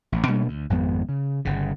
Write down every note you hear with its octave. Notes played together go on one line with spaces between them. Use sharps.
A1
B2 G3 A#3 D4
D2
G#1 F2 G#3 B3
C#3
G1 C#3